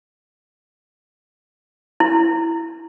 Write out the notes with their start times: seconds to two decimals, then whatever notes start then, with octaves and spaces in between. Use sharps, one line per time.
2.00 E4